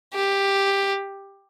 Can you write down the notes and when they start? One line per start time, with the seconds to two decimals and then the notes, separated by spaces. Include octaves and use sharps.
0.14 G4